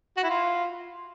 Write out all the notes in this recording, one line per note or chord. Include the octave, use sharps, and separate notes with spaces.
F#4
E4
F4